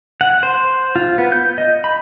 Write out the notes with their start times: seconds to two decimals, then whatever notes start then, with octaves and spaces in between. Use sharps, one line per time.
0.21 F#5
0.43 C5
0.96 F4
1.18 B3
1.32 G6
1.58 D#5
1.84 B5